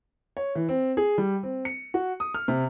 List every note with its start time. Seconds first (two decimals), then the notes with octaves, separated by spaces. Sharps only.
0.37 C#5
0.55 E3
0.69 C4
0.97 G#4
1.18 G3
1.43 C4
1.65 C#7
1.94 F#4
2.20 D#6
2.34 F6
2.48 C3